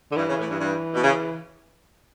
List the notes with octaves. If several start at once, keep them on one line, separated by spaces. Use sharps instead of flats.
D3
G2 E3
C#3
A2
G2
G2
B2
C#3